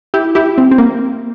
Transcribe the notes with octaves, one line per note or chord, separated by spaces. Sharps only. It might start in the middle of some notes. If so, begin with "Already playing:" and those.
E4 G4
E4 G4
C4
C4
A#3